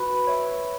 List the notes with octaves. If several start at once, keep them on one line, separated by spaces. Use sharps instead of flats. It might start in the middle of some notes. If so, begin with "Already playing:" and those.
Already playing: F#4 B4
C#5 E5